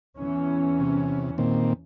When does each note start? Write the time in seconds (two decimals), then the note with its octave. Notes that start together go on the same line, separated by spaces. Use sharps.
0.17 E2 E3 C#4
0.80 C3
1.38 A#2 D#3 C4